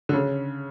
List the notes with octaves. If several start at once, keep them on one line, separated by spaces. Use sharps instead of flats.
D3
C#3